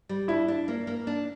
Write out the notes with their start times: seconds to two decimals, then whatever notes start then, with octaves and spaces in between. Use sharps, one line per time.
0.09 G3
0.28 D4 E4
0.48 D4
0.68 A#3
0.87 A#3
1.07 D4